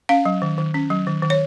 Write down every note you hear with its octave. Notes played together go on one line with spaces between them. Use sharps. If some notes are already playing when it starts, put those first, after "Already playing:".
C#4 F5
F#3
D#3
D#3
C#4
F#3
D#3
D#3
C#5